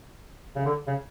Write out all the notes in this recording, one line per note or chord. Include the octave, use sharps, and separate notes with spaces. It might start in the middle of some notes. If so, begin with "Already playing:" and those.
C#3
D3
C#3